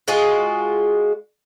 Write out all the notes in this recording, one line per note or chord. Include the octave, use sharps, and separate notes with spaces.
G#3 F4 F#4 G#4